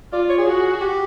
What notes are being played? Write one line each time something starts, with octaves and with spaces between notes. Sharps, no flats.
F4 D5
C#5
G#4
F#4
G4